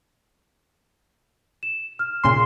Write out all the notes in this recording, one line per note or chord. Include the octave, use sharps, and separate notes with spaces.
E7
F6
A#2 C#3 C6